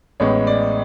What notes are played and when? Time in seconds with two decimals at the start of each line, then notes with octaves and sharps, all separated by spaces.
0.20 A1 A2 G#3 B3 C#5
0.47 D5